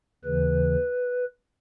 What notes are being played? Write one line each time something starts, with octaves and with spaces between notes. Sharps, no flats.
D#2 C#3 E3 B4